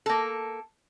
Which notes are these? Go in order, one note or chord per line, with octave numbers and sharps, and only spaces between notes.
A#3 A4